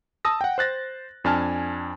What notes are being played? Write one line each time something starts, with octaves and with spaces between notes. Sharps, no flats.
A5 D#6 E6 A#6
F#5 G5
C5 F#6 A6 A#6
F2 D4 G#5 A5 F6